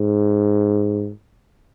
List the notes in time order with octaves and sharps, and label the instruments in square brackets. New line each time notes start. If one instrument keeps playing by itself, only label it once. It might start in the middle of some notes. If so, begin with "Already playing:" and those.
Already playing: [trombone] G#2